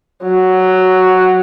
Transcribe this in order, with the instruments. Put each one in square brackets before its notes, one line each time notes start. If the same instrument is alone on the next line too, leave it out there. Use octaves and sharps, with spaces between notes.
[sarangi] F#3